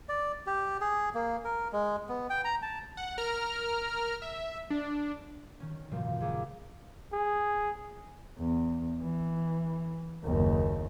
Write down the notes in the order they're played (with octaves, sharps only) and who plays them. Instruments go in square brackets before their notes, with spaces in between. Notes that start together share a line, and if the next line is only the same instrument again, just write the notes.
[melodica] D5
G4
G#4
A#3
A#4
G#3
B3
G5
A#5
A5
[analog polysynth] F#5
A#4 A#5 F6
E5
D4
[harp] D#3 C#4
G#1 C#2 F#2 A#2 F3
D#2 G#4 D6
[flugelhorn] G#4
[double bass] E2
E3
F#1 D#2